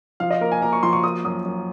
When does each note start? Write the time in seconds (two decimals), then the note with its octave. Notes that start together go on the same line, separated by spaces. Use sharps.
0.20 F3 F5
0.30 D#5
0.41 A#3 A#4
0.52 G#5
0.62 A#3 A#5
0.73 C#6
0.83 F3 C6
0.93 C#6
1.04 A#3 D#6
1.24 F#2 D#6
1.45 F#2